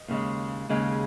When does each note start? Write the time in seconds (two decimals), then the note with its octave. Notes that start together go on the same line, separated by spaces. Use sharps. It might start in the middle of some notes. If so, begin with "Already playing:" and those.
Already playing: D#5
0.08 D#2 C#3 G#3
0.69 D#2 C#3 G#3